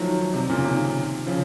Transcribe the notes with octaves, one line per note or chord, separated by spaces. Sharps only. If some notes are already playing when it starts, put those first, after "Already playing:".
Already playing: D#3 F3 F#3 A3
C3
A#2 C#3
C3 D#3
C#3 F3